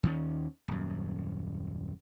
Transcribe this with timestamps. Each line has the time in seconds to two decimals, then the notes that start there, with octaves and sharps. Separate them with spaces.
0.03 D#2 D#3 C#4
0.68 D#1 F#2